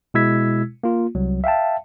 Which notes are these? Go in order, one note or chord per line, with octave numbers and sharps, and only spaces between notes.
B2 G#3 E4 E6 G#6 B6
A#3 F4
C2 F#3
E5 F5 G5 A5